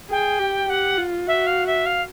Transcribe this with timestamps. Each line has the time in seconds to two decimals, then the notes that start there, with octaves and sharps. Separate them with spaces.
0.10 G#4 G5
0.40 G4
0.69 G4 F#5
0.98 F4
1.27 F#4 E5
1.46 F5
1.66 E5
1.85 F5